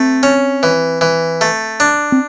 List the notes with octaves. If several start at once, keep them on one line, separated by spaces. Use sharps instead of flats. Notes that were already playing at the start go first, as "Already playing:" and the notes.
Already playing: A3 C4
C#4
E3
E3
A3
D4
C4